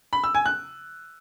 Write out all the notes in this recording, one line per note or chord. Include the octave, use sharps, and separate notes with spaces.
B5
E6
G#5
F#6